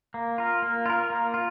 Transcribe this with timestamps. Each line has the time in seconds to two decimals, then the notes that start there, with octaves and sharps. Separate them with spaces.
0.14 A#3
0.38 F4 A#4
0.62 A#3
0.86 F4 A#4
1.10 A#3
1.34 F4